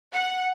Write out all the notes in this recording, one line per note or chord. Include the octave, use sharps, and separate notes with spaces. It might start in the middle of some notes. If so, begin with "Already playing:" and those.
F#5